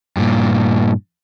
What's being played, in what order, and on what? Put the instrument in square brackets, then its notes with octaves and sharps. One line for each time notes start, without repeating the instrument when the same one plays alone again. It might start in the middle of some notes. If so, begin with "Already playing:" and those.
[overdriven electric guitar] G2 A#2